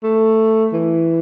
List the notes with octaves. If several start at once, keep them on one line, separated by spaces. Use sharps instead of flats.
A3
E3